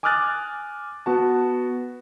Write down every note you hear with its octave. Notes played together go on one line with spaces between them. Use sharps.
G#5 D6 D#6 F6 F#6 A6
B3 F#4 A5